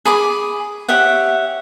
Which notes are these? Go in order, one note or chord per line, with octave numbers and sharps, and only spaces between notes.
G#4 B5 D6
G4 C#5 E5 F#5